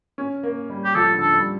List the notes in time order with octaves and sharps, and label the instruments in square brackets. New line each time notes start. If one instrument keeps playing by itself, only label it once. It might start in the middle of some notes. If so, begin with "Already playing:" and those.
[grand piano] C#4
A#3
G3
[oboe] G4
[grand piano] F3 [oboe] A4
[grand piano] D3
[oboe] A4
[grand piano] G3